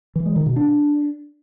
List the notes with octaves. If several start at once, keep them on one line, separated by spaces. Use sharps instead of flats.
E3
G#3
D#3
B2
D4